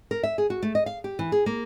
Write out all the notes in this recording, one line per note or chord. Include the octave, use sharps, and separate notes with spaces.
A#4
E5
G#4
F#4
A3
D#5
F5
G4
E3
G#4
A#3